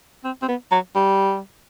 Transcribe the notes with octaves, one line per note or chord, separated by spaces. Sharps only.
C4
C4
B3
F#3
G3